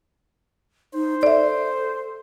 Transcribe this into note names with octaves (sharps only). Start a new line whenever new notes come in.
D#4 C5
A4 D5 E5